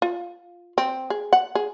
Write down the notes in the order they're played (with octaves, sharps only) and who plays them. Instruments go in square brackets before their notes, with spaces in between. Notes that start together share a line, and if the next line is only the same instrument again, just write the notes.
[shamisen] F4
C4
G#4
F#5
G#4